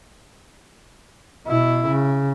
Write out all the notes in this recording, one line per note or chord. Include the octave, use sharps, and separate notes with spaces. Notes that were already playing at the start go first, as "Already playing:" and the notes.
B2 E4
C#3